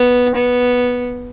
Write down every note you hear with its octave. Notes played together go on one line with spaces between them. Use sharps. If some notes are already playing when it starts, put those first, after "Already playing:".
Already playing: B3
B3